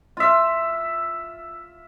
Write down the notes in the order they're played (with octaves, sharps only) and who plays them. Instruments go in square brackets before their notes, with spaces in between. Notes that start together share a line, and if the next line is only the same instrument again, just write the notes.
[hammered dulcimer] F4 E5